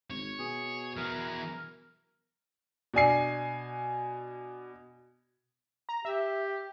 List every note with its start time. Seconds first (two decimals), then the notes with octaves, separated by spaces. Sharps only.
0.10 G#1 C#5
0.39 B2 G#4
0.97 E3 G#4 A#4
2.94 B2 D4 G#5 C7
5.89 A#5
6.05 G4 E5